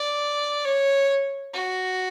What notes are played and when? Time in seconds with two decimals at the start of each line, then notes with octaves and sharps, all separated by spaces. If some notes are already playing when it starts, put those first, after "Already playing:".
Already playing: D5
0.65 C#5
1.54 F#4